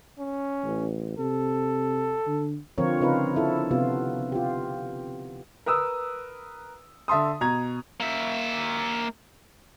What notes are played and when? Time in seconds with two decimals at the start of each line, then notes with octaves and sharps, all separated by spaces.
0.19 C#4
0.64 A1
1.18 C3 A4
2.27 D3
2.78 D3 F3 C4 F4 A#4 C#5
3.01 C#3 C4 D#4 F4 A#4 B4
3.36 E4 A4
3.71 C3 B3 F4
4.32 F4 G4
5.66 A#4 B4 D#6 E6
7.08 D3 E5 A5 C6 D#6
7.41 B2 A#5 G#6
8.00 A#3 E5